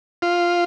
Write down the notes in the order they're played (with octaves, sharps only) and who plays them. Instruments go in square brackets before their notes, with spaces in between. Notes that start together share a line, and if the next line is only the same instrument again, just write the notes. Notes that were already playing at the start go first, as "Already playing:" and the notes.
[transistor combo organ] F4